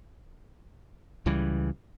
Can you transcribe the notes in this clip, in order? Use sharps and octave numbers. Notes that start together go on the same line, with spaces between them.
C#2 C#3 E3 G3